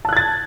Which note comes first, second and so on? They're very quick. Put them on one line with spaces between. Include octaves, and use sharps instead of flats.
A5 F#6 G#6 A6